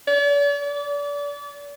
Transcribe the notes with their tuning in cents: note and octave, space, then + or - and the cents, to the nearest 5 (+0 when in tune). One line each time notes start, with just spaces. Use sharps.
D5 -45
D5 -35